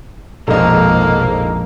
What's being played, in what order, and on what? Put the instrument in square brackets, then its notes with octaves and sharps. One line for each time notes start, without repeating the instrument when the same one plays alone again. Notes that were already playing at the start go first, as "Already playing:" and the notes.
[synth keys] A#1 F2 G#2 [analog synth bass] B2 [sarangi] A#3 [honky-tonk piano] A4 D#5